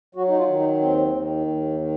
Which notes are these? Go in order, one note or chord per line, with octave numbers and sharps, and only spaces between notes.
F#3 F#4
D#4
F4
D#3
D#4
D#2 C4
D#3
D#2
D#3